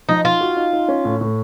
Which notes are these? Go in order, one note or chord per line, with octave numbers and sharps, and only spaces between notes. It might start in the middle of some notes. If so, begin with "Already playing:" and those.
F3 D#4
D#4 F4
F#4
D#4
D#4
C#4
A2
A2